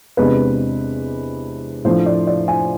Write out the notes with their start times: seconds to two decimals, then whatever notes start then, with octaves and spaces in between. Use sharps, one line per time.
0.17 E2 C3 G#3 D4 B4
1.84 A2 F3 A3 D4 C5
2.06 D5
2.27 D5
2.48 G#5